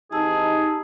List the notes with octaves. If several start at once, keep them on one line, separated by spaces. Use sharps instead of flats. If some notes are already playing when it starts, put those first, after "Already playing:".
E3 C4 D#4 G4 G#4 A5 E6